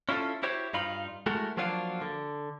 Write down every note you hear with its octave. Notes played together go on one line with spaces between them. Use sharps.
C#4 E4 F4 G4 A4
E4 F#4 G4 C5 C#5
G2 D#4 F4 B5
G#3 A3 E4 F#4 A#4
F3 F#3 A#3 D4 F4 F#4
D3